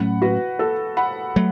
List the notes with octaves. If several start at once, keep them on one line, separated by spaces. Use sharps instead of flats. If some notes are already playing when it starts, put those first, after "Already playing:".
Already playing: A2 F#3 A3 C#4 F#5 B5
F#4 B4
A4
F#5 B5
F#3 A3